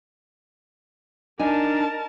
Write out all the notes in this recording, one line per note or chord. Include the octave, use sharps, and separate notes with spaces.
D4 D#4 A#4 G#5 A5